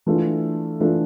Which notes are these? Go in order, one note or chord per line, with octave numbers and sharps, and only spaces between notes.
E3 A3 D4 F4 A4
E3 A3 D4 F4 A4